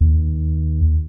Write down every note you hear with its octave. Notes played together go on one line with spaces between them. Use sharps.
D#2